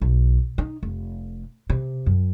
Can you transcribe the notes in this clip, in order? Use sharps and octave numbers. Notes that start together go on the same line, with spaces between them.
B1
D#4
F1
C3
F#2